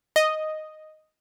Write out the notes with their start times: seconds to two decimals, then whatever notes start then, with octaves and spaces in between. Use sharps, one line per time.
0.16 D#5